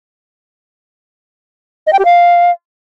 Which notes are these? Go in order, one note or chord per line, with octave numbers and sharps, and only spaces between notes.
D#5
G5
G4
F5